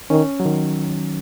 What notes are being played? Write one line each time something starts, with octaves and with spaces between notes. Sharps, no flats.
D#3 C#4
F#3
D#3